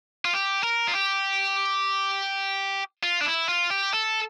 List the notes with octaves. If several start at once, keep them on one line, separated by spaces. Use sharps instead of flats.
F4
G4
A#4
F4
G4
F4
D4
E4
F4
G4
A4